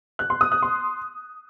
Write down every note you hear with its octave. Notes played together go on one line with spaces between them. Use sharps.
F#6
C6
D#6
F#6
C6